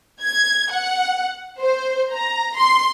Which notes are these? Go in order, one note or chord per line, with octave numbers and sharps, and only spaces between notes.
G#6
F#5
C5
A#5
C6